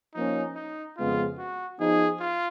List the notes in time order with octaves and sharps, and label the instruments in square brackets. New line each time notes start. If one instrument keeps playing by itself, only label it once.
[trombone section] F3 A#3 C#4 [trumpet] D#4
[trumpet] D#4
[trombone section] F2 C#3 G#3 B3 [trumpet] F4
[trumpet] F#4
[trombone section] F3 B3 D#4 [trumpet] G#4
[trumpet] F4